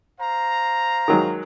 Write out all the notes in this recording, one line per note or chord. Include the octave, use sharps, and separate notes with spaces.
C5 F5 A#5
D#3 F#3 G#3